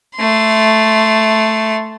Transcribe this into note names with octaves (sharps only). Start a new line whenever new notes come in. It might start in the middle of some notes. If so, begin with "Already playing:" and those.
A3 C6